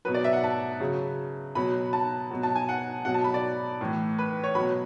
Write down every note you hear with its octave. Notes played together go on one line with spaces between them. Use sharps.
B2 F#3 B4
D5
E5
F#5
A5
C#3 F#3
B2 F#3 B5
A5
B2 F#3
A5
G#5
F#5
B2 F#3 F#5
A5
B5
D5
A2 E3
B4
C#5
B2 F#3 B5